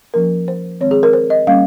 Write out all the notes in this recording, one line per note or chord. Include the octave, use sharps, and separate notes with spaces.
F3 A#3 C#4 A#4
C5
D#3 G#3 C4 C#5
G#4
A#4
C5
D#5
G3 A#3 C#4 F5